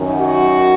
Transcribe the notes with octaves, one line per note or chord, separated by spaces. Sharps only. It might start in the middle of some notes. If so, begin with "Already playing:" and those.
Already playing: F#2 D#3 F#3
F#4